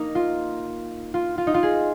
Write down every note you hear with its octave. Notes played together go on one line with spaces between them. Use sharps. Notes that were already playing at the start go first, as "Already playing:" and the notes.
Already playing: A#3 D#4
F4
F4
F4
D#4
F4
G#4